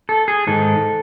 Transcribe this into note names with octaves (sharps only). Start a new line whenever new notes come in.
A4
G#4
G#2 D#3 A4